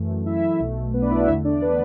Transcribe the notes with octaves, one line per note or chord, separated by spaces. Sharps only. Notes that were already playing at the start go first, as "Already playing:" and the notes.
Already playing: F#2 E3 A3
E4 E5
B1 B2 A3
B3 B4
D4 D5
E4 E5
F#4 F#5
E2 D3 A3 E4 E5
D4 D5
B3 B4